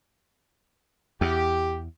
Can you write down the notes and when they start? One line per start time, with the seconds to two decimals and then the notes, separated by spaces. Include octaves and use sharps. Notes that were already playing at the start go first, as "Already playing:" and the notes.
1.21 E2 G4